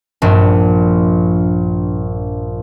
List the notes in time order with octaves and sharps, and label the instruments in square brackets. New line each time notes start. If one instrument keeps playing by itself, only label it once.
[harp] A#1 G2